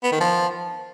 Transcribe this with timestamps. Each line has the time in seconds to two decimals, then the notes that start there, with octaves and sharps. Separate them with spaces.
0.04 B3
0.12 D#3
0.20 F3